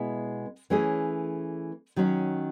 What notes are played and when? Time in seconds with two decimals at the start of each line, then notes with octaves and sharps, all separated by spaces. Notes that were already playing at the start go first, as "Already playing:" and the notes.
Already playing: B2 G#3 B3 E4
0.70 E3 A3 C#4 G#4
1.96 D#3 F#3 C#4